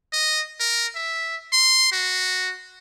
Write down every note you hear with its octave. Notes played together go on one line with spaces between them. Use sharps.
D#5
A#4
E5
C6
F#4